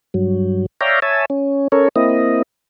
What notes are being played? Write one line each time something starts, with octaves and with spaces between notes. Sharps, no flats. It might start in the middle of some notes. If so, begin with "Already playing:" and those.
G2 F#3
C#5 D5 E5 F5 G5 A#5
C#5 E5 G#5 A5
C#4
C#4 A4 A#4 C#5
A#3 C4 E4 D#5